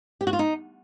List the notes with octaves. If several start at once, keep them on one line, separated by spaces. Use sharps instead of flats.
G4
F#4
F4
D#4